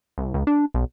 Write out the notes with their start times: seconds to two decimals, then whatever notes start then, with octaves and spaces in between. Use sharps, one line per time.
0.18 C2
0.34 C#2
0.47 D4
0.74 B1